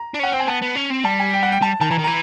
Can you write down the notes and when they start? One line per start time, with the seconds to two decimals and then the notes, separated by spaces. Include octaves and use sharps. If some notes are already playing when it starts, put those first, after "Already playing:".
Already playing: A#5
0.14 D4
0.19 C#4 F#5
0.32 C4 G5
0.40 G#5
0.48 B3 A5
0.62 B3
0.76 C#4
0.91 C4
1.05 G3 A5
1.20 G#5
1.34 G5
1.43 F#5
1.52 G5
1.61 G3 A5
1.80 D#3 A5
1.90 E3 A#5
1.98 D#3
2.04 E3 A#5